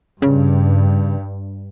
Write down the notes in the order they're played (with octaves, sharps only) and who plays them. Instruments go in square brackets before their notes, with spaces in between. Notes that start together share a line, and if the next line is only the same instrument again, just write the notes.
[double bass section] G2 [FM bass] C#3